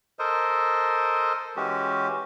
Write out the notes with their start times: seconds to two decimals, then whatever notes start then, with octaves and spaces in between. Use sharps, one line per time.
0.19 A4 A#4 C5 D#5
1.56 E3 G#3 C#4 F#4 G4